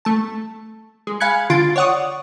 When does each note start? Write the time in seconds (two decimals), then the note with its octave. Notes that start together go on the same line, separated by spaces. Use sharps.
0.05 A3 A5
1.07 G#3
1.20 F5 G#5 B5 F#6 G#6 C#7
1.50 D3 F4 C6 A6 D7
1.76 C#5 D5 F#5 C#6 D#6